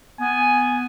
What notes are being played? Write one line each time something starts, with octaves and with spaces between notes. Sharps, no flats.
B3 G#5